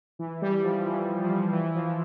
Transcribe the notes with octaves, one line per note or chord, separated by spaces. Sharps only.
E3
G3
G3
F3
E3
F3
G3
E3
F3